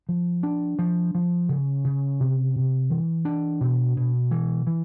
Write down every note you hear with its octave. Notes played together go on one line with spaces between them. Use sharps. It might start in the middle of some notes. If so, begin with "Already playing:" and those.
F3
D4
F3
F3
C#3
C#3
C3
C3
E3
D4
B2
B2
E3
E3